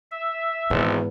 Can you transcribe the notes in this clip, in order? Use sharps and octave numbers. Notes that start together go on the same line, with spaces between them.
E5
G#1 E2 G#2